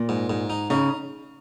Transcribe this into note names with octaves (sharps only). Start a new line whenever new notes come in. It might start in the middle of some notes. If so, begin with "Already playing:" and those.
Already playing: A#2
G#2
G#2
D#4
C#3 D#4